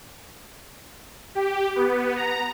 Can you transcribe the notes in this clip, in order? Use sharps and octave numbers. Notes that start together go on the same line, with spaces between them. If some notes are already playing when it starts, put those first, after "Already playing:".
G4
B3
A#5